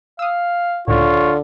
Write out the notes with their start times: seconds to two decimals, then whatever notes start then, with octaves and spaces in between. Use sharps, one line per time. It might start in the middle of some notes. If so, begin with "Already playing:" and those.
0.19 F5 D#6 E6
0.88 C#2 A2 D3 F4 C#5